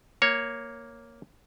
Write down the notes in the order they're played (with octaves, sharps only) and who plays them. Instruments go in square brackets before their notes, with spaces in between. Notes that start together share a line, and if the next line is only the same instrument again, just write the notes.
[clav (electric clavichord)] A#3 C#5